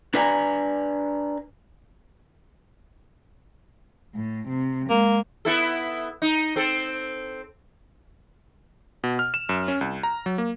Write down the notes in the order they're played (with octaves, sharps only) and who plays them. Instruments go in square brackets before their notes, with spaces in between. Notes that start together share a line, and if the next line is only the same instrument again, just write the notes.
[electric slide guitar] D4 B4 D5 E5 G#5 A#5
[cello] A2
C3
[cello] G#3 [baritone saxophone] A#3
[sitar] B3 E4 A4
D#4
C4 A4
[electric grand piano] B2
F6
E7
F#2
C#4
C2
A#5
F#3
A#3